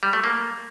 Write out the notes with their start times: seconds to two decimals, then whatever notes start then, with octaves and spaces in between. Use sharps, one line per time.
0.03 G3
0.13 A3
0.24 A#3